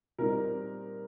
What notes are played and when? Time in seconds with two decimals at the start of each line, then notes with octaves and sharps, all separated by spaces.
0.19 A#2 G3 C4 D#4 A#4